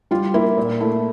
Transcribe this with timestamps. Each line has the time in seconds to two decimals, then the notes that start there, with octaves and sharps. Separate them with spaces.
0.11 G3 F4
0.34 A#3 E4
0.57 A#2
0.80 A3 E4